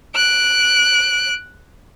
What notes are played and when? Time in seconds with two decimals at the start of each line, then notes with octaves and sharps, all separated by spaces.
0.16 F#6 D7